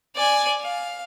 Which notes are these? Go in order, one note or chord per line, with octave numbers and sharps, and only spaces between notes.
D5 G#5
F5